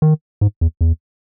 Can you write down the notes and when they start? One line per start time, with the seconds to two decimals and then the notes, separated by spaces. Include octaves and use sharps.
0.02 D#3
0.41 G#2
0.61 E2
0.81 E2